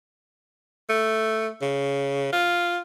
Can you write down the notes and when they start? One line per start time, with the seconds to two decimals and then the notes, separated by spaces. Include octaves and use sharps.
0.89 A3
1.62 C#3
2.33 F4